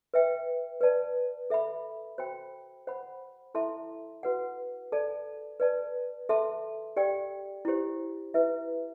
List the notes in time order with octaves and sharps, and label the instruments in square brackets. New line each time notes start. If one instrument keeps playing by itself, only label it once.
[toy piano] B4 E5 G5
B4 D5 A5
A4 E5 B5
F#4 C5 G5 B5
C5 F#5 B5
E4 A4 E5 A5 C6
F#4 B4 F#5
A4 D5 A5
B4 D5 A5
A4 E5 A5 C6
G4 D5 G5
E4 G4 C5
E4 B4 E5